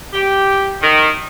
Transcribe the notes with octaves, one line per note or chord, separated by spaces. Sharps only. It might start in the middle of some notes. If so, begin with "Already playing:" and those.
G4
D#3